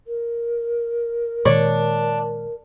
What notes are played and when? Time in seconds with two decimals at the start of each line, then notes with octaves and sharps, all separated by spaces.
0.07 A#4
1.45 A#2 D#3 G#3 D4 C#5